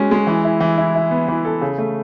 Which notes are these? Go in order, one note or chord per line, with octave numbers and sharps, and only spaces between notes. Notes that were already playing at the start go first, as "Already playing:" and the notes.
Already playing: G#3 C#4 F#4
G#3
E3
E4
E3
E4
E4
B3
E3
A4
C#3
A3